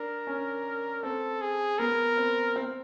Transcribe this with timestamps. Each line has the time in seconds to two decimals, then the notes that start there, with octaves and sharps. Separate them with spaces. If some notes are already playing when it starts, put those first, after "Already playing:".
Already playing: D4 A#4
0.27 C#4
1.03 C4 A4
1.41 G#4
1.79 B3 A#4
2.17 C4
2.56 C4